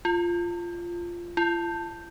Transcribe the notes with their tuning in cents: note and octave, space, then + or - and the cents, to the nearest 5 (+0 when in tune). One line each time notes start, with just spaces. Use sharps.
F4 -10
F4 -45